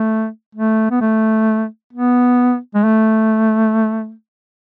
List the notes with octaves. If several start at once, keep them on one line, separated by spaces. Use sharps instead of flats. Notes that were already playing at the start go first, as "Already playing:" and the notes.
Already playing: A3
A3
B3
A3
B3
G#3
A3